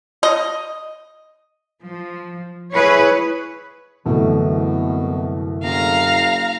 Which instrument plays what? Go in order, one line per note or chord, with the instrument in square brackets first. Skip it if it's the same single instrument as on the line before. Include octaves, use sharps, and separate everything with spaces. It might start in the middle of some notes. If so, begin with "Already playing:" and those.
[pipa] D#5
[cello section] F3
E4 G#4 B4 C#5
[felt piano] C2 A3 [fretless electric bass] F#2 D3 E3 [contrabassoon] B2
[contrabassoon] F#1 [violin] F5 A#5